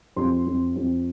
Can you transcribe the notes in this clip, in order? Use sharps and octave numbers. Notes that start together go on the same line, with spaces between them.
F2 C6
F2
F2